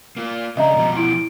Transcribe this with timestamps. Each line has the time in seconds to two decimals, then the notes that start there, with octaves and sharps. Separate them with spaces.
0.17 A#3 F4
0.57 C#3 G#3 D4 D#5 E5 A#5
0.76 B2 F3 G3
0.97 E4 D7